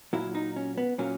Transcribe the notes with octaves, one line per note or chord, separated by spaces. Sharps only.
A#2 F#3 A#3 E4
D#4
C#4
B3
A#2 F#3 A#3 C#4